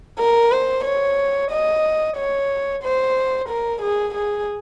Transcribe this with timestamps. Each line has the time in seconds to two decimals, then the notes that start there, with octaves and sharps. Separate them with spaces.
0.19 A#4
0.52 C5
0.85 C#5
1.51 D#5
2.17 C#5
2.83 C5
3.49 A#4
3.81 G#4
4.15 G#4